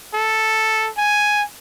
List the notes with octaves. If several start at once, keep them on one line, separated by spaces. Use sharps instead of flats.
A4
G#5